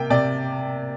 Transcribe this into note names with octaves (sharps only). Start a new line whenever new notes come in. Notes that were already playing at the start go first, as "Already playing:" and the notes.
Already playing: C3 A#3 G5
C3 D5